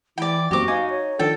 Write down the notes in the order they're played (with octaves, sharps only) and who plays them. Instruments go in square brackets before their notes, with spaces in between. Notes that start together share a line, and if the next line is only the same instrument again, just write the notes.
[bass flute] E3 [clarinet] E4 [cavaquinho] D5 G5
[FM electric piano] F#2 C4 [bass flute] A#3 [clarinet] F#4 [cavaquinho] G4 D6
[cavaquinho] D#4 [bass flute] F5 [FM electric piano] G#5
[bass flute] C#5
[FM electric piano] D#3 F3 D4 [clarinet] A4 [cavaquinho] G5